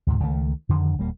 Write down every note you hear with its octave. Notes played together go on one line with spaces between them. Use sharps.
D2 G#2 C3
C#2 D#3 A3
F2 D3 D#3
D#1 G3 A#3